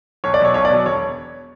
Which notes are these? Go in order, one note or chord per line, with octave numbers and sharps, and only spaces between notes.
B1 C#5
D5
B2 F#3 C#5
B1 C#5
D5
B2 F#3
E1 C#5